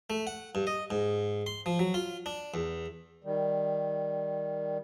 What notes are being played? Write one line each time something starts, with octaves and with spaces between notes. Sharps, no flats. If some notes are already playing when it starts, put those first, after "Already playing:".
A3
F#5
G2
D#5
G#2
C6
F3
F#3
F4
D4
E2
D#3 G3